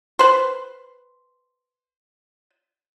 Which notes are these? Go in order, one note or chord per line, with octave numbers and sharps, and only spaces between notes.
B4 C5